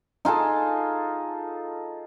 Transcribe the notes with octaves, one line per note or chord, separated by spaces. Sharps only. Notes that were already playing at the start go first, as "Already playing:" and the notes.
D#4 F4 G#4 A4